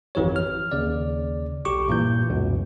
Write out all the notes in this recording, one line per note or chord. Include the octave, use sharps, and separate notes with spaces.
G#1 F2 E3 G4 C#5
F6
D#2 C#3 D5
B1 G4 C#6 D6
G2 A#2 E3 G6
C#2 F#2 B2